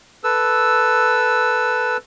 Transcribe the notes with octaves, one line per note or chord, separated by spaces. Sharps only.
A4 B4 E6